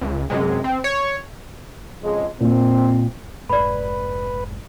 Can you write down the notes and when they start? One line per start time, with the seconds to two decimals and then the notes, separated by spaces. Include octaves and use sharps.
0.01 C#2
0.30 F#2 C3 G#3
0.64 C4
0.84 C#5
2.03 F2 C#3 G#3
2.41 A#2 C4
3.49 F1 G#2 B4 D5 B5